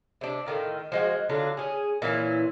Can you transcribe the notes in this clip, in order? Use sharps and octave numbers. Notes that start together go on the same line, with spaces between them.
C3 D4
A2 D#3 F4
F3 G#3 F#4
D3 F#3 D4 F4
C#4 G#4
A#2 E3 C#4 E4